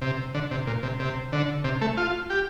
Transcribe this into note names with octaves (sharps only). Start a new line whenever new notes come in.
C3
D3
C3
A#2
C3
C3
D3
C3
A3
F4
G4